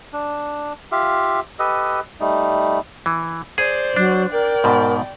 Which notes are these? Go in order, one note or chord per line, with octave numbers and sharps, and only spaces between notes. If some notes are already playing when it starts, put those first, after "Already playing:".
D4
F4 G4 E5 F5
G4 A4 B4 D#5
G3 A3 D#4
E3
G#4 C5 D5
F#3 D4
A#4 D5 G5
G#2 B2